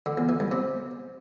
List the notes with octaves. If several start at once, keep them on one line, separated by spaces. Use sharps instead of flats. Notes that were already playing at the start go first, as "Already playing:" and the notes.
D3
E2
E3
G2
C3